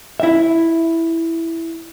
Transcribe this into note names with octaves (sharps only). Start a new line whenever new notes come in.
E4 E5